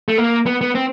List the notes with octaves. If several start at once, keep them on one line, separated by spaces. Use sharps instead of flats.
A3
A#3
B3
B3
C4